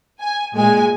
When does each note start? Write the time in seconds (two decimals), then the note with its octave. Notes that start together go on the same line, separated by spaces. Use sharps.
0.20 G#5
0.55 A#2 G#3 G#5